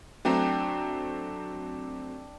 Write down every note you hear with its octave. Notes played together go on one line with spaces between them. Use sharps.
F#3 A3 C4 D4 G5 A#5